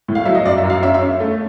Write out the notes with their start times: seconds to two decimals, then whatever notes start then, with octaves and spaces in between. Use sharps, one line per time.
0.08 A2
0.15 F5
0.25 F#3 E5
0.35 D#5
0.45 F#2 D5
0.58 E5
0.64 F#2
0.70 F5
0.83 C#4 E5
0.94 E5
1.02 C#4
1.20 A3